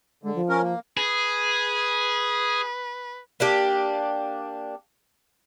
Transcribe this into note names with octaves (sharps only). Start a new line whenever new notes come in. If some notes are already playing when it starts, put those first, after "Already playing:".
D3 G#3
F3
C#4 A#4
A#3
G#4 B4
A#3 D4 G4